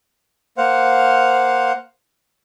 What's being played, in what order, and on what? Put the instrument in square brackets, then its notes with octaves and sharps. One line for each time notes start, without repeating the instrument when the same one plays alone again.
[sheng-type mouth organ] A#3 C5 F5 F#5